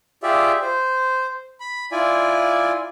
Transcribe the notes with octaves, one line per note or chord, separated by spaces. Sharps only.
F4 G4 G#4 D5 E5
C5
B5
E4 F4 D5 G#5